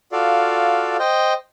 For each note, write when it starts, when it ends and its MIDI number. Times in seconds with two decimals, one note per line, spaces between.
0.12 0.97 65
0.12 0.97 66
0.12 0.97 69
0.12 0.97 74
0.12 0.97 77
0.99 1.34 72
0.99 1.34 75
0.99 1.34 79